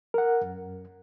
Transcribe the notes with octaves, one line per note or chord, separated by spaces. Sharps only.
A#4 F#5
F#2